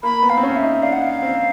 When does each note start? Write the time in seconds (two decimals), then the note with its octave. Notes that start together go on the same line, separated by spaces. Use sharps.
0.03 A#3 B5
0.23 B3
0.30 F5
0.37 C4
0.43 C#4
0.56 E5
0.62 D#4
0.82 D4 F5
0.92 F#5
1.02 F5
1.22 C4